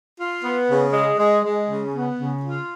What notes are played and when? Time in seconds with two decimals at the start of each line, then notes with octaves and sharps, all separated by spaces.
0.19 F4
0.44 B3
0.68 C#3
0.93 G#3
1.18 G#3
1.43 G#3
1.68 C#3
1.93 B3
2.18 C#3
2.43 F4